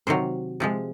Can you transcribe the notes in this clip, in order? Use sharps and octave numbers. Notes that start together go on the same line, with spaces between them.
C3 D#3 F#3 C5
C3 F3 G#3